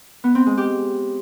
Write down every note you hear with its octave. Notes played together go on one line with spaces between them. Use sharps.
B3
C4
G#3
G4